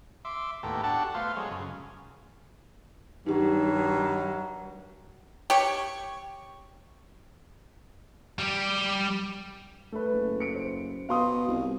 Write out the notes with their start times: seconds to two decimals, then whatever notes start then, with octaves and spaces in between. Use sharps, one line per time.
0.25 E5 C6 D6
0.63 D#2 A2 B3 G4 A4 A#5
0.84 D4 F#4 G4 A4 F#5 A5
1.14 A3 B3 F4 C5 F5
1.36 F#3 G#3 C#5
1.51 F#2 C#3
3.26 G2 D#3 F#3 D#4 G4
5.50 G4 C#5
8.38 G3 G4
9.92 A3 B4
10.13 F#1
10.40 C#7 D7
10.55 C5
11.09 B2 F5 C6 D#6
11.48 C2